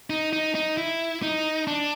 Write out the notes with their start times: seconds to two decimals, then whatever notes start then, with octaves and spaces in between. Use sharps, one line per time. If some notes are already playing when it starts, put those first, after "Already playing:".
0.10 D#4
0.33 D#4
0.55 D#4
0.77 E4
1.23 D#4
1.67 D4